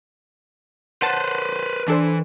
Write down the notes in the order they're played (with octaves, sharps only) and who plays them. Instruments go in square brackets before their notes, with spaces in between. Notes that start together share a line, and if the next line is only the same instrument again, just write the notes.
[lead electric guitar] B4 C5 [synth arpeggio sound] F#5 A5
[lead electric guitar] E3 [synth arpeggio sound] D4 A4 C5